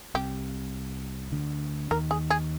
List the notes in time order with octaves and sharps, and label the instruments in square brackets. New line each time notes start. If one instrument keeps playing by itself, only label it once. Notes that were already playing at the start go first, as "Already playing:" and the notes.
[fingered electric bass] C2 C3 [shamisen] G4
[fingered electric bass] D2 D3
[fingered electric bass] D#2 D#3 [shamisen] A#4
[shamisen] G#4
G#4